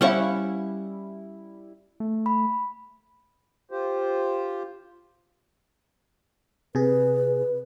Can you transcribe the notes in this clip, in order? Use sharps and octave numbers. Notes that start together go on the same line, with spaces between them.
G3 C#4 E4 C5 F5 F#5 C#6
A3
B5
F4 G4 C5
C3 G#4 B4